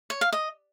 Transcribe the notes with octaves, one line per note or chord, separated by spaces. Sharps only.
C#5
F5
D#5